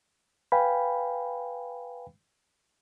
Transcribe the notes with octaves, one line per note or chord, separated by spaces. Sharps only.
B4 F5 G5 G#5 B5